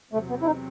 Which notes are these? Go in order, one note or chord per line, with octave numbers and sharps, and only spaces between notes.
E2 C3 F#3 A3 C4
B3
E4
D#4